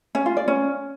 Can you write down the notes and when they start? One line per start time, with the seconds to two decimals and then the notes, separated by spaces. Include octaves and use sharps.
0.15 C#4
0.26 F4
0.37 D5
0.48 C#4